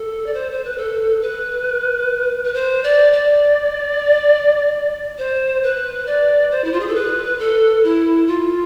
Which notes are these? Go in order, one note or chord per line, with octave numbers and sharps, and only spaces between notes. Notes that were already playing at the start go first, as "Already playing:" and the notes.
Already playing: A4
D5
C5
C5
B4
A4
B4
B4
C5
D5
D5
C5
B4
D5
C5
E4
F4
G#4
A4
B4
A4
E4
F4